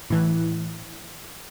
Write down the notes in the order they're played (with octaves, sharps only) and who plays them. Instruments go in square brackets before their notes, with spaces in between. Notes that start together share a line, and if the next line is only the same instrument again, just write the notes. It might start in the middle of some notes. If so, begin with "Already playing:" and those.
[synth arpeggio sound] A2 E3